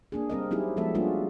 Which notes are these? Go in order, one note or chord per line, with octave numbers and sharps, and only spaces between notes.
A#3 D4 G#4
G3 C4 A#4 D#5
F#3 C4 D#4 E4 G4 G#4
F3 G#3 B3 A4 E5
G3 A#3 D4 F4 F#4 G#4